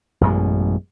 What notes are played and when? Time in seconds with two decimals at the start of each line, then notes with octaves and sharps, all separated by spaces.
0.21 A1 F#2 B2 G#3